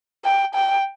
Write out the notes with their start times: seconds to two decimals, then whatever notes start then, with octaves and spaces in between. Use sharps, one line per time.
0.25 G5
0.55 G5